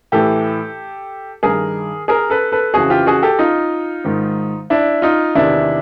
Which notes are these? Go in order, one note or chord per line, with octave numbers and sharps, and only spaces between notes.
A2 E3 G4 A4
G2 D#3 G#4 A#4
G#4 A#4
A4 B4
A4 B4
F2 C#3 E3 F#4 G#4
F4 G4
F#4 G#4
G4 A4
D#4 F4
G#2 D#3
D4 E4
D#4 F4
E2 C3 D#3 D4 E4